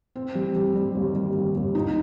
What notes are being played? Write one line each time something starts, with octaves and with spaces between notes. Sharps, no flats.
C4
G3
G3
G3
D#2
G3
D#2
D#2
D#4